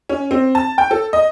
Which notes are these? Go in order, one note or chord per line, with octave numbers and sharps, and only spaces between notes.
C#4
C4
A5
G5
A4
D#5